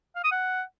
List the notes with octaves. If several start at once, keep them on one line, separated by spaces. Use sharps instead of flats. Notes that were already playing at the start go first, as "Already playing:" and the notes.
F5
D#6
F#5